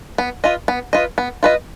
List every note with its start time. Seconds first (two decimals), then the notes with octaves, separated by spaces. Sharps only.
0.18 B3
0.44 F4 B4 D#5
0.68 B3
0.93 F4 B4 D#5
1.18 B3
1.43 F4 B4 D#5